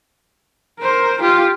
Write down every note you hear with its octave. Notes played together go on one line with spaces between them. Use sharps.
A#4 C5
F4 G4